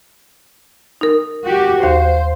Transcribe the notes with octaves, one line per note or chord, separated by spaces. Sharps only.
D#4 A#4
F#4 G4
D#2 C5 F5